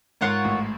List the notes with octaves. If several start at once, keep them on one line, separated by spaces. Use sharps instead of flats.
G#2 F4 A#4 C#5 F#5
A1 A2